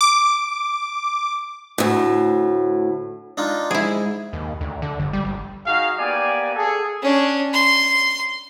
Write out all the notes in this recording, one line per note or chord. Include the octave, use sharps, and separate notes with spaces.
D6
D2 A2
D4 D#4 F4
G#2 E4 G#4
D#2
D2
D3
G1
G3
G1
D#4 F#4 G#4 F5
A#3 B3 G4 D5 G#5
G#4 A4
C#4 D4
C6